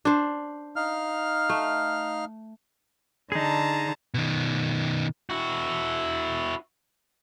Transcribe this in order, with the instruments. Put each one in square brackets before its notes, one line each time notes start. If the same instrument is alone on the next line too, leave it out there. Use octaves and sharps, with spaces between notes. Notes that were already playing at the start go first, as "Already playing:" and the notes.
[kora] D4 C5
[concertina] D#4 F5 F6
[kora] A3
[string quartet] D3 A5 A#5 [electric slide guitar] D#4 G#4
[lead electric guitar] B2 D#3
[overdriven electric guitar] E4 F#4